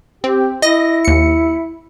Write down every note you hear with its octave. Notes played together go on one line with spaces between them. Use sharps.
C4 G4
E4 D#5 A#6
D#2 C#7